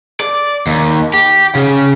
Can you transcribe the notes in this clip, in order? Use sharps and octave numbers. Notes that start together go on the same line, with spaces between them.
D5
D#2
G4
C#3